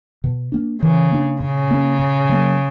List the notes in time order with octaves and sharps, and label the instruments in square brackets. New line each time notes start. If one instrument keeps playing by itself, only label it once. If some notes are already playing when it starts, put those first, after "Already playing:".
[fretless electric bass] B2
A#3 D4
[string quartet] C#3 [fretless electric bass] E3
[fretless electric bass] A#3 D4
[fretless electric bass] A#2 [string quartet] C#3
[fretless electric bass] A#3 C#4
A#2
F#3 A#3